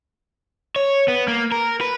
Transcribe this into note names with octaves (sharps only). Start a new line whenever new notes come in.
C#5
B3
A#3
A#4
B4